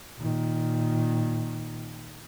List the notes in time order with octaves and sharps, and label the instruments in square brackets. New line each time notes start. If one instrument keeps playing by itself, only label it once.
[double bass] A#2 D#3